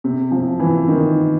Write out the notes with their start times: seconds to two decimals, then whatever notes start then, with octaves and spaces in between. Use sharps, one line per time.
0.04 C3
0.31 F3
0.60 E3
0.88 D#3